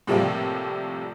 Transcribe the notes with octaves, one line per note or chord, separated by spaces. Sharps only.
A2 C3 F3 G3 A#3